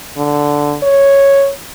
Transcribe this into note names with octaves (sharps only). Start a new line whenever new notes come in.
D3
C#5